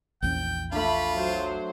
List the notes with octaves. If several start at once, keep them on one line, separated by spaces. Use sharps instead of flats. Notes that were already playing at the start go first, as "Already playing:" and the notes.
A#1 E2 C#4 G5
A3 D4 F4 B5
F#3 C5